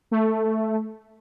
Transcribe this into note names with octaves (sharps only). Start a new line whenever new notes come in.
A3